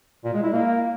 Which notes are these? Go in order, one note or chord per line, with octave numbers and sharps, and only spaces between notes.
A#2
G#3
E4
A#3